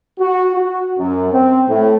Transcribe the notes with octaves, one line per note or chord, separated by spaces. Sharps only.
F#4
F#4
F#2
C4
A2